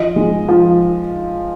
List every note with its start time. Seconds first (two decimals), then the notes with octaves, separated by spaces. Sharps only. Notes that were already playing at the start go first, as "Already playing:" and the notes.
Already playing: F3 D#5
0.16 G#3
0.48 F3